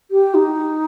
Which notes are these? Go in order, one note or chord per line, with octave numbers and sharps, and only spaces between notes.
G4
D#4